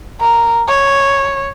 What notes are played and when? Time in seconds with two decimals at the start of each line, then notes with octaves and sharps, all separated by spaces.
0.21 A#4
0.68 C#5